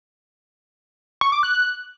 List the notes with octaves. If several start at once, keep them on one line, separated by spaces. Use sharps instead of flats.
C#6
D6
F#6